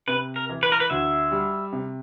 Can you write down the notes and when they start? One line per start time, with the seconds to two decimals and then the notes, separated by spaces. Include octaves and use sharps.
0.08 C3 B4
0.36 A#4
0.49 E3
0.63 B4
0.72 A#4
0.80 B4
0.90 D2 E5
1.32 G3
1.72 C3